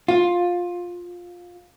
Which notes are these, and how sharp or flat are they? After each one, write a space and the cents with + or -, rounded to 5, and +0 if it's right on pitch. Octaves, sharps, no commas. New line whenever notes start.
F4 +15